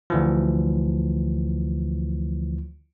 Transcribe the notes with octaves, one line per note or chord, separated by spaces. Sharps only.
D2 E3 F3